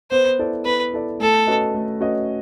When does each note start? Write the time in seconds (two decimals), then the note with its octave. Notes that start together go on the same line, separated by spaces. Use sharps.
0.11 B3 C5
0.39 E4 A4 D5
0.65 B3 B4
0.93 E4 A4 D5
1.20 A3 A4
1.47 C#4 F#4 B4 D#5
1.74 A3
2.01 C#4 F#4 B4 D#5